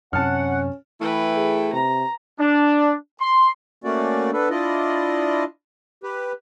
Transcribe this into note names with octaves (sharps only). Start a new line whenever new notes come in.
F#2 C3 C#4 F#5 A5 F6
E3 A3 E4 B4 G5
G#4
C3 A#5
D4
C6
A3 A#3 C#4 F#4 D5
B3 D4 A4 B4
D4 E4 F4 D5 D#5
G4 B4